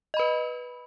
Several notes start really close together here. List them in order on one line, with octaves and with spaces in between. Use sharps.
D#5 B5 B4